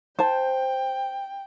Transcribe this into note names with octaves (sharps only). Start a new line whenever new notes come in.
C5 G5 A5